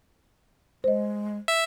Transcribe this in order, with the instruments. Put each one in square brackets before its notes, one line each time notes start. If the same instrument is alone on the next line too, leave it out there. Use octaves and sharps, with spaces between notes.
[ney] G#3 [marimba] C5 D#5
[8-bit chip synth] E5